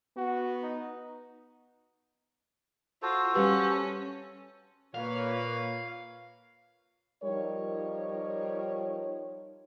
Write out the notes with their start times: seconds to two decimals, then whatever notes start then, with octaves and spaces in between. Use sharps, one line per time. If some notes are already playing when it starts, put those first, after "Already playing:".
0.17 B3 F#4
0.63 D#4
3.02 F4 F#4 A4 C5
3.34 G3 C#4 G4 B4
4.94 A#2 A#3 B4 C#5 F5
7.23 F3 G3 D#4 F4 A#4 C#5